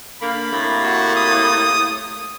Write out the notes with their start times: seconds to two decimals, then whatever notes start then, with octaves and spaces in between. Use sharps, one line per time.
0.21 D3 A#3 B5
0.52 A2 C3 A#3
0.83 F#4
1.16 D#6